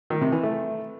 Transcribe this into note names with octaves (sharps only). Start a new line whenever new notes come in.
D#3
C3
E3
A3